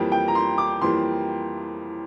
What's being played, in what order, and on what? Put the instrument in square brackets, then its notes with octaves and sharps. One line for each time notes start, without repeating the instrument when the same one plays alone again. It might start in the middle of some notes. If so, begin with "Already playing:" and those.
Already playing: [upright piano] F2 E3 G3 A#3 G5
G5
A#5
C6
D6
F2 E3 G3 A#3 C6